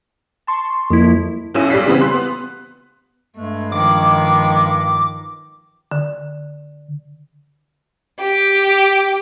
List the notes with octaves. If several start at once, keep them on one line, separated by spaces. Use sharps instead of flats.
A5 C6 C#6
F2 F3 A#3 E4
B1 B2 C#4 E4 E6 D#7
B1 G3 D5 B6 C7
C#3 E3 G3 B3 C4
G4 C6 F#6
B3
G2 G#3 A3
D#3 F3 D6
D3
G4